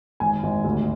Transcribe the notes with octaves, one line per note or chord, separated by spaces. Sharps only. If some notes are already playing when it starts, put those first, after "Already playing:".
G#1 G#5
G#1
D2